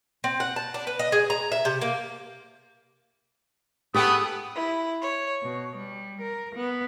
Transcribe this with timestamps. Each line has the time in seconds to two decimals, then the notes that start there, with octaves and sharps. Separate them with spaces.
0.24 C4
0.40 F#5
0.56 A5
0.74 D4
0.87 B4
0.99 D#5
1.12 G#4
1.30 A#5
1.52 E5
1.65 C3
1.82 A#3
3.94 A3 B3 G4 G#4 G5 D#6
4.55 E4
5.01 C#5
5.44 B2
5.76 G3
6.20 A#4
6.55 B3